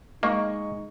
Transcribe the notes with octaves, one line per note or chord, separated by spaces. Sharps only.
G#3 A#3 D#4 D#5 C#6